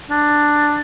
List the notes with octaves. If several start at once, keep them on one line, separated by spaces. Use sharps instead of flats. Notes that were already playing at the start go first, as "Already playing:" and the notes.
D4